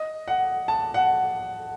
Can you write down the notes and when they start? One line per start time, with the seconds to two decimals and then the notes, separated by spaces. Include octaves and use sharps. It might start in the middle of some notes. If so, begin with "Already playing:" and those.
Already playing: D#5
0.28 F#5
0.68 A5
0.94 F#5